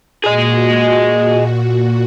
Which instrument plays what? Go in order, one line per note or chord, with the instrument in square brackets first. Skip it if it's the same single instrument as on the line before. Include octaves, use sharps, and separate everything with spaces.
[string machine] A#2 F#4 [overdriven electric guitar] G#4 D#5